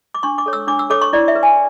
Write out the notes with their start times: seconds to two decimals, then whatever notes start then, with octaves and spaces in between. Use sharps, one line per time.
0.14 D6
0.23 D4 C#6
0.38 D6
0.46 A4 C#5
0.53 E6
0.67 D4 D6
0.79 E6
0.90 A4 C#5 D6
1.02 C#6
1.13 E4 D5
1.28 E5
1.35 B4
1.43 G#5